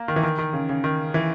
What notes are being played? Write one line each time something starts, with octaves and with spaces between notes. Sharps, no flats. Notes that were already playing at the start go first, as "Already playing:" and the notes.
Already playing: A#3
D#3
E3
D#3
D#3
C#3
C#3
D#3
E3